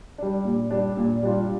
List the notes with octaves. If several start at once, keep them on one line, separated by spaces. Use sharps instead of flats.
G3 D4
A#2
G3 D4
A#2
G3 D4 F4